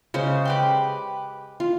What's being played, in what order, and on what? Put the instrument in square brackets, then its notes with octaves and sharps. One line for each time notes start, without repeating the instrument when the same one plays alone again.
[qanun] C#3 G#3 C5 [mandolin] C#4
[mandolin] G4 B4 D6 [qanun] C6
[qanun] F4